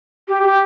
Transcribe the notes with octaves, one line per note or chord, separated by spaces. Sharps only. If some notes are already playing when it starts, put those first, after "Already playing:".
G4
G4